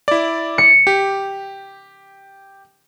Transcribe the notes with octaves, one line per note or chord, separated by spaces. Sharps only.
E4 D5
C#7
G4